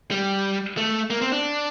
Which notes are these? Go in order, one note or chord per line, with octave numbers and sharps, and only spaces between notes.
G3
A3
A#3
C4
D4